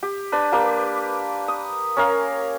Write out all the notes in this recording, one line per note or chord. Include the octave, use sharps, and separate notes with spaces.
G4
D4 B4
A#3 G4 B4
D#6
C#4 A#4 F5